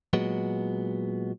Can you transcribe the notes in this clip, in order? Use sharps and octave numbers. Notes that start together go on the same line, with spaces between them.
A#2 F#3 G#3 B3